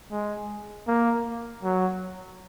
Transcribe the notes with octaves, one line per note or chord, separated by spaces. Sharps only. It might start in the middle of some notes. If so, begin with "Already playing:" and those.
G#3
A#3
F#3